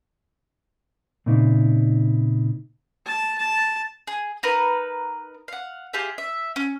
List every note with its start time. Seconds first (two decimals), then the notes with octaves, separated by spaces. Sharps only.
1.26 A#2 C#3 C4 D#4 E4
3.06 A5
3.38 A5
4.07 G#4
4.43 D#4 A#4 B4
5.48 F5 F#5
5.93 F4 G4 G#4 E5
6.18 E5
6.56 C#4